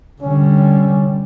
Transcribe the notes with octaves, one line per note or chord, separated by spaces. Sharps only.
D3 G3 C#4